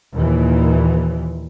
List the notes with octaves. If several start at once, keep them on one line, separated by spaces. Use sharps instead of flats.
D#2 A#2 E3